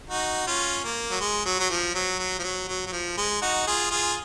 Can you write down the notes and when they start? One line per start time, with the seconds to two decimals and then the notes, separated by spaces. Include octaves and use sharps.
0.10 D#4 F#4
0.47 C#4 F4
0.84 A#3
1.11 F#3
1.21 G#3
1.46 F#3
1.59 F#3
1.70 F3
1.95 F#3
2.19 F#3
2.39 F3
2.43 F#3
2.68 F#3
2.86 F#3
2.93 F3
3.17 G#3
3.42 D#4 F#4
3.67 F4 G#4
3.91 F4 G#4